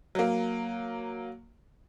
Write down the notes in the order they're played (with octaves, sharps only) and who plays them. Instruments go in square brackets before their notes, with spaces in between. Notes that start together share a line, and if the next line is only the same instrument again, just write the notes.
[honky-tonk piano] F#3 A#3